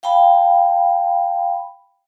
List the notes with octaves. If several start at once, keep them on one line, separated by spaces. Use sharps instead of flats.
F5 G5 A5 B5